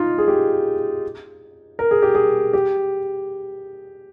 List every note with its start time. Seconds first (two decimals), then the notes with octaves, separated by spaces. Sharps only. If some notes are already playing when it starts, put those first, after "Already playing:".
Already playing: D#4 F4
0.18 G#4
0.28 G4
1.79 A#4
1.91 G#4
2.02 G4
2.15 G#4
2.53 G4